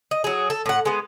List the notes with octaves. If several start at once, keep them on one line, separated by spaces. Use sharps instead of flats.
D#5
F#3 G#4
A4
A2 F#5
G#3 B3